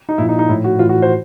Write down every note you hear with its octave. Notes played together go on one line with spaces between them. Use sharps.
D#4
A#2 F3 E4
D#4
D#4
A2 F3 E4
F#4
A2 E3 F4
F#4
C5